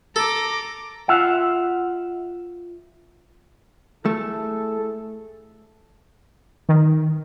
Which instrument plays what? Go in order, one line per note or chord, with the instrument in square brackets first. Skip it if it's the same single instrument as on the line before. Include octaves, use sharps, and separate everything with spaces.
[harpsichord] A4 [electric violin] A#5 D6
[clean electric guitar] F4 E5 F#5
[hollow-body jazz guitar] A3 [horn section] E4 G#4 A4
[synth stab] D#3